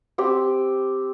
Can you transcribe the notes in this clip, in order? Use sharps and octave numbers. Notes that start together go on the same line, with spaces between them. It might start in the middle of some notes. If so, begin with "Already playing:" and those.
C4 G4